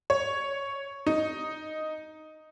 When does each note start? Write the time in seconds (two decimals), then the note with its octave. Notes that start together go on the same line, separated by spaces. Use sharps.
0.10 C#5
1.07 D#4